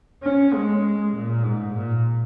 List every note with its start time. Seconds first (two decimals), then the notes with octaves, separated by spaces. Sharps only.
0.23 C#4
0.53 G#3
1.13 A#2
1.43 G#2
1.73 A#2